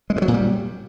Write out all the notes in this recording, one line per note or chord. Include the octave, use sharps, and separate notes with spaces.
G#3
G2
F#3
A#2
G3